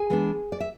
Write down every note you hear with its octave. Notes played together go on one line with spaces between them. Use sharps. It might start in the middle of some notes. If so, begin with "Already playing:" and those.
Already playing: G#4 G#5
E3 G#3 B3 D4
D5
E5